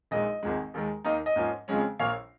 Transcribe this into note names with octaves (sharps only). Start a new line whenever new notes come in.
A#1 A#2 G#3 D#4 D#5
G#1 G#2 F3 G#3
D#2 D#3 G#3
D#2 D#3 A#3 D#4 D#5
D#5
G#2 F3 A#3 C#4
F2 C#3 F3 G#3 C#4
A#1 A#2 A#3 C#5 F5